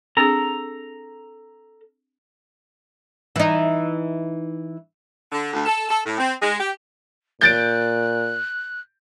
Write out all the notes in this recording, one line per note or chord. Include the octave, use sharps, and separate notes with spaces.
C4 D4 G#4 A4 A#5
E3 D#4
D3
D2
A4
A4
A2
C4
G#3
G4
A#2 F#6 G6 A6 D7